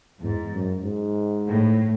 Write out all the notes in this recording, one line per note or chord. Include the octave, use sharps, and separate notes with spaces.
E2 G#2
F#2
G#2
A2